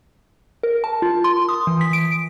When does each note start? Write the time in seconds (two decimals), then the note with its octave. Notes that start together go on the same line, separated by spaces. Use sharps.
0.63 A#4
0.84 A5
1.02 F4
1.24 C6
1.49 D#6
1.67 E3
1.81 B6
1.93 D7